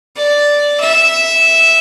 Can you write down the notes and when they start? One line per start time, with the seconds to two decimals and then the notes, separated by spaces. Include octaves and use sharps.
0.16 D5
0.80 E5